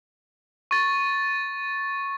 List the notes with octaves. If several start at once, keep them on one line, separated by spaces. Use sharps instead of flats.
C#6 A6